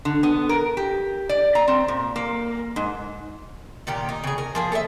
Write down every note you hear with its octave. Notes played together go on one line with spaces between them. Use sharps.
D3
B3
A#4
G4
D5
A#5
C4
A#2
A#3
G#2
A#2 D#3 G4 A#4
D#4
C#3 G#4
A#4 G#5
F3 A#3 G#4
A4 A#4 D#5 E5